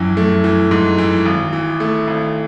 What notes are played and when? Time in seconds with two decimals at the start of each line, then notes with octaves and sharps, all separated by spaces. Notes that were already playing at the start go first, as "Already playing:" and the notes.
Already playing: A#1 F#2 E3
0.17 A3
0.44 E3
0.71 G#2
0.98 E3
1.26 G#1
1.53 E3
1.80 A3
2.08 G#1